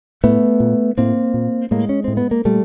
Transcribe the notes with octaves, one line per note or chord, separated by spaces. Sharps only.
A2 A3 B3
A#2
A2 A#3 C4
A#2
A2 G#3 A#3
C#4
A2 C4
B3
A#3
A#2 G3 A3